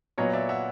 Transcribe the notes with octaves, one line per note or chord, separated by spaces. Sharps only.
A#2 F#3 B3 C#5 D#5
D5 E5
E5 F#5